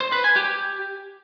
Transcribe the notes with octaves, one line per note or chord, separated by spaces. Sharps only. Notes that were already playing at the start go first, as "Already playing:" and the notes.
C5
B4
G#5
G4